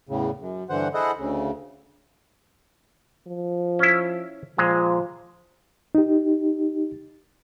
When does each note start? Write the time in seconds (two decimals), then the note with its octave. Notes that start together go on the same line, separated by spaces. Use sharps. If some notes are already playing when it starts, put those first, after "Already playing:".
0.09 E2 A2 C#3
0.40 F#2
0.70 G2 D3 E3 C5 F#5
0.94 E4 G#4 A4 C5 D#5 F#5
1.18 D2 C#3
3.27 F3
3.79 C#4 E4
4.58 A#2 F3 G#3
5.95 D#4 G4